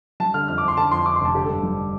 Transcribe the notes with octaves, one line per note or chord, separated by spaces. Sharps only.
G3 A5
D3 F6
F2 F6
D6
F2
C6
D3 A5
F2 C6
F3 D6
C6
F1 A5
D3 G4
A4
G2
G3